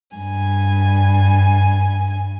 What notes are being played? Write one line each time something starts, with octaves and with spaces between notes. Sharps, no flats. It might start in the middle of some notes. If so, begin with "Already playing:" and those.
G2 G#5